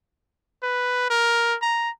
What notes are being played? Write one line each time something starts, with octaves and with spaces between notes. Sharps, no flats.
B4
A#4
A#5